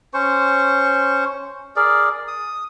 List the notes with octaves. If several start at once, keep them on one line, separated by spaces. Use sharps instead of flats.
C#4 C5 C#6
G#4 A#4 D5
D#6